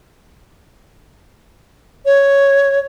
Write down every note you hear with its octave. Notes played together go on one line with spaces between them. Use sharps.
C#5